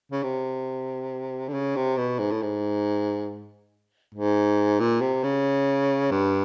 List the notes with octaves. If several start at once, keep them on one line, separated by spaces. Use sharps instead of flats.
C#3
C3
D3
C#3
C3
B2
G#2
A2
G#2
G#2
A#2
C3
C#3
G2